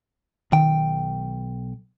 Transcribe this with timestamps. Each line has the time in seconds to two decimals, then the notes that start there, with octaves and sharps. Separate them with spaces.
0.52 B1 D#3 G5